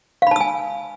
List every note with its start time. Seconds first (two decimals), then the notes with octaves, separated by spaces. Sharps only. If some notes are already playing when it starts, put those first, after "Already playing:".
0.22 F5
0.27 B5
0.31 A5
0.36 E6
0.40 G#5